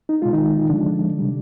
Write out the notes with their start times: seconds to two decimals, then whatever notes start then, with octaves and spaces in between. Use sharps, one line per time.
0.09 D#4
0.22 B2 G#3 F4
0.33 D#3 D#4
0.70 D3 F3 G#3 D4
1.18 C3 G3